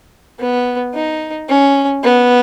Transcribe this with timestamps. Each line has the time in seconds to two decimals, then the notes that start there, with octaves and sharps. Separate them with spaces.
0.39 B3
0.94 D#4
1.49 C#4
2.03 B3